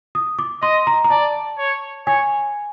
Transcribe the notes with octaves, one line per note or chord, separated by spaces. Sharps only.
D#6
D6
D#5 C6
A#5
A#5
D5 A5
C#5
C#5 G#5